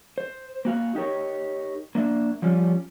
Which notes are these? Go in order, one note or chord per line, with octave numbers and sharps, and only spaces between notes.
C5
A#3 F#4 F5
D#4 G4 A#4 C#5
A#3 D4 E5
F3 G3 C#4 F4